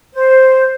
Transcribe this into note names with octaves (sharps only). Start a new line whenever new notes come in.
C5